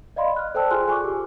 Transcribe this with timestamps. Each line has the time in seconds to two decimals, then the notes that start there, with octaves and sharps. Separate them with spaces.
0.16 D5 D#5 F5 B5 C6
0.36 F6 F#6
0.55 A4 C5 D5 G5 A5 E6
0.70 F4 G#4 G#5 C6 F6 F#6
0.88 G#5 C#6 D6
1.04 G4 A4